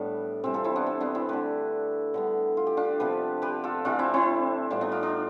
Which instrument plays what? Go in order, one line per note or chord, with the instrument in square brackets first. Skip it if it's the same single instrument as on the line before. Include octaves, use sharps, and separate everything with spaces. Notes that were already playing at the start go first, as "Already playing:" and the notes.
Already playing: [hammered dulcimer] A2 G3 B3 D4
C3 E3 G3 C4
F4 A4
C4 E4
B3 D4
C4
B3 D4
C4 E4
D3 A3 G4 B4
D3 G3 B3
F4
G4
D4 F4
C3 F3 B3 G4 B4
G4 B4
F4 A4
C3 E3 A3 D4 F4
C4 E4
C4 E4
A2 G3 B3 D4 F4
B3 D4
D4 F4
D4 F4